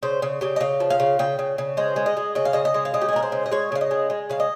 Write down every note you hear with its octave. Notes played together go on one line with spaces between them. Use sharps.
C#3 C5
C#3
C#3 G4
D#5
C#3 F5
F3
F5
C#3
C#3 G5
C#3
C#3
G#3 C5
G#3
D#5
G#3
C#3 D#5
F5
C#3 D#5
D#5
G#3
F5
C#3 D#5
G4
G#4
G#3 A#4
C5
C#3
D#5
G#3 C#5
C#3 F5
D#5
G#3
G#3
C#3 F5
D#5